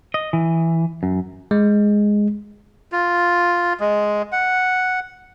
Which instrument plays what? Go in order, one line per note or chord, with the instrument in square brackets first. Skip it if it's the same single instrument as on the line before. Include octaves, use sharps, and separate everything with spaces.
[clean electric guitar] D#5
E3
F#2
[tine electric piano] G#3
[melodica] F4
G#3
F#5